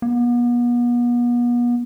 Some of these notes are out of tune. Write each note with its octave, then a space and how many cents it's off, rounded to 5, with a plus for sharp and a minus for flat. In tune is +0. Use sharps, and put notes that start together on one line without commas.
B3 -40